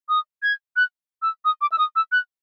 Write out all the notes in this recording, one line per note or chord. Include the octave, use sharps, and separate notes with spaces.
D#6
G#6
F#6
E6
D#6
D6
E6
D#6
E6
F#6